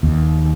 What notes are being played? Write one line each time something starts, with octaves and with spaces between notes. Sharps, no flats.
D#2